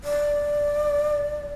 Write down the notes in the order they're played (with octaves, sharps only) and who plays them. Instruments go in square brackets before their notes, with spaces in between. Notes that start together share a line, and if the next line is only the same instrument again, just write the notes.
[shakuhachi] D5